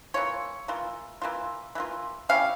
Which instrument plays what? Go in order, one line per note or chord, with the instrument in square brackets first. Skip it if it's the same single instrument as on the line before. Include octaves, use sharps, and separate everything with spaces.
[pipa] E3 A#3 F4 C#5
E3 A#3 F4
E3 A#3 F4
E3 A#3 F4
G3 C#4 E4 F5